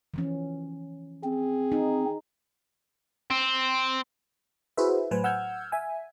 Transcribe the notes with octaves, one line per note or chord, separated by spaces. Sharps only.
E3 F3 C#4
C4 G#4
D#4
C4
E4 F#4 G#4 B4 C5 E5
A2 F#3 B4 C5 G#5
F#5 E6 F6 G6 G#6
E5 G#5